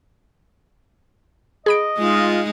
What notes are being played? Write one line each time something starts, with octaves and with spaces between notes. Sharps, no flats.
G#4 D#5 B5 D7
G#3 D#4 F4